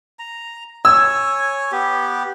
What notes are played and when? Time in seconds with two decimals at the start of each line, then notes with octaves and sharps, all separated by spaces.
0.19 A#5
0.85 C#5 G#5 E6
1.72 B3 G4